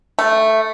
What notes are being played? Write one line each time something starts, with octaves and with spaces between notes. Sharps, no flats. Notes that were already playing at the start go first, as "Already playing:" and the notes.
A3